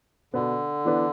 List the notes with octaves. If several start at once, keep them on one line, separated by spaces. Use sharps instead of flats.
B2 D3 B3 D4 B4
E3 B3 D4 B4